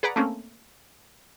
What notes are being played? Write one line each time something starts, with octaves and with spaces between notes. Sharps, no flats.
G#4 B4 D5 F#5 A#5
A3 A#3 C4 C#4